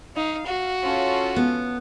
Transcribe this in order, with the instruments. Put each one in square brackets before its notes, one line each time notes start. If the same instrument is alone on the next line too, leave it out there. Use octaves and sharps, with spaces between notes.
[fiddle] D#4 [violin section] F5
[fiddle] F#4
[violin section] C#4 F4 A4
[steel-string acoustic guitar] B3